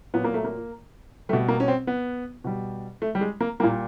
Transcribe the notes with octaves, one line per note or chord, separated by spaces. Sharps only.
A#2 F#3 B3
A#3
A3
A#3
B2 G3 A3
A#3
C#4
C4
B3
B2 G3
A3
G3
G#3
A#3
A#2 G3 A#3